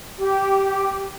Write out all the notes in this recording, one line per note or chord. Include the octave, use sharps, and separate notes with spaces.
G4